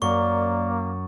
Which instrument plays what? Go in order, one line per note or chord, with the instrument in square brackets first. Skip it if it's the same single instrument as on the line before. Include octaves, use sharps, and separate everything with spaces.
[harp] F#2 [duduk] A#3 [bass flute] D5 [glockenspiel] C#6